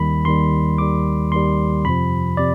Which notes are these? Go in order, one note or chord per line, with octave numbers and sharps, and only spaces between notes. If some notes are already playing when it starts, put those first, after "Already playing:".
Already playing: D#2 D#3 G3 B5
D#2 D#3 G3 C6
D#2 D#3 G3 D6
D#2 D#3 G3 C6
F2 C3 F3 B5
C3 D5